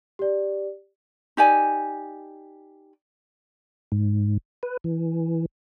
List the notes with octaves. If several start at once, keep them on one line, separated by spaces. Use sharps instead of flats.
G4 D5
D#4 G4 D5 G#5
G#2
B4
E3